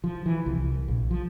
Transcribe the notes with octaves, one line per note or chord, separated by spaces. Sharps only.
F3
E3
C2
A#1
F3